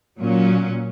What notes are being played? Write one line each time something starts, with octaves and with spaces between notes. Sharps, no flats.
A#2 F#3 C#4